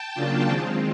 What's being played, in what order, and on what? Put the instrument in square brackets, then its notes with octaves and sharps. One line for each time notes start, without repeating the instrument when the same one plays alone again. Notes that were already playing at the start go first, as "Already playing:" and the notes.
Already playing: [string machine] G5 A5
C#3 F#3 A#3 D4 F4
D#3 G#3 C4 F4